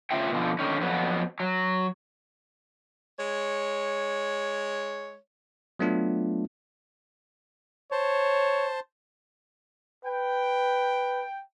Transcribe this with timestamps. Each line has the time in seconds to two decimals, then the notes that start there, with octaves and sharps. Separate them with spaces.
0.11 C#3 F4 E5 G5
0.31 B2 D3 F3
0.59 D3 D#3 C#4 D#4
0.81 F2 F#3 B3
1.40 F#3
3.18 G#3 C#5
5.79 F#3 A3 B3 D4 F4
7.92 C5 C#5 A5
10.05 B4 G5